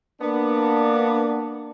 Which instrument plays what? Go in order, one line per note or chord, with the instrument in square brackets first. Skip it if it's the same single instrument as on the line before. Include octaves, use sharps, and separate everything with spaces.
[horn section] A#3 B3 D4